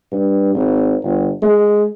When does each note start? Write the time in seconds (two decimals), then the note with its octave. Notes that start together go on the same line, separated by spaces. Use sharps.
0.12 G2
0.55 G#1
1.03 G1
1.42 G#3